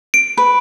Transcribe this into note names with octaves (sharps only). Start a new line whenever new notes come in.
D7
B4